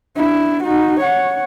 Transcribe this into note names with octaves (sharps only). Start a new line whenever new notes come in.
D4 E4
D#4 F#4
C#5 F#5